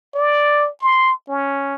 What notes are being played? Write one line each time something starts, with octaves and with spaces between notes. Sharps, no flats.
D5
C6
C#4